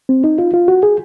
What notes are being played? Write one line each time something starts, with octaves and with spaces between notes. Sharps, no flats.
C4
D#4
F4
F4
F#4
G#4